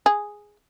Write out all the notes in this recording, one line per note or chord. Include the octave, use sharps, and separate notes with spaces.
G#4